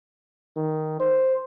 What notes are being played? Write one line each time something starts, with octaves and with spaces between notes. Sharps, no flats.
D#3
C5